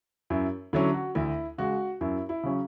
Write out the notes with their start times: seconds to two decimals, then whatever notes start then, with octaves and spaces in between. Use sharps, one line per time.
0.30 F#2 E4
0.73 D3 F#3 C#4 E4
0.94 F#4
1.15 D2 E4
1.58 C#3 G#3 F#4
2.01 F#2 E4
2.29 E4
2.43 C#3 F#3 C#4